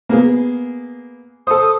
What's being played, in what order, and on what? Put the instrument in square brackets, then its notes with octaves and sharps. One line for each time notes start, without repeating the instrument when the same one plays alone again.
[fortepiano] A#3 B3 G#4
[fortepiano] A4 C5 [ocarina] D#6